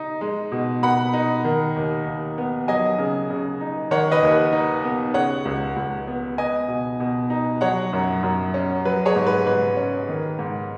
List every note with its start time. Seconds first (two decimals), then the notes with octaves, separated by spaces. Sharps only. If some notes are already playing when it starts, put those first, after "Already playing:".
Already playing: D#4
0.21 G#3
0.52 B2
0.83 B2 F#5 B5
1.13 D#4
1.45 D#3
1.76 D#2
2.06 D#2
2.38 B3
2.68 F#3 D#5 G#5
2.99 C#3
3.30 C#3
3.61 D#4
3.91 D#3 C#5 F#5
4.11 B4 D#5
4.22 D#2
4.32 B4
4.53 D#4
4.84 B3
5.14 C#3 C#5 F#5
5.45 C#2
5.76 C#2
6.08 B3
6.38 B3 D#5 G#5
6.68 B2
7.00 B2
7.30 D#4
7.61 F#3 C#5 F#5
7.93 F#2
8.23 F#2
8.54 C#4
8.85 F#3 B4
9.05 G#4 C#5
9.16 G#2
9.26 B4
9.46 G#2 B4
9.77 C#4
10.09 D#3
10.39 G#2